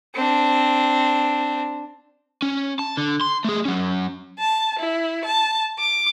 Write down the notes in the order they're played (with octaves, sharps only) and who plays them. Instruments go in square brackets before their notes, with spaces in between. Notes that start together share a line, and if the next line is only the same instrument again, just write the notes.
[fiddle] C4 D4
[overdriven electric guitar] C#4
A5
D3
C6
A3 G#4
F#3 C#4
[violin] A5
E4
A5
D6